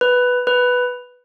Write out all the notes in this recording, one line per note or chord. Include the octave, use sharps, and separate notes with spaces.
B4
B4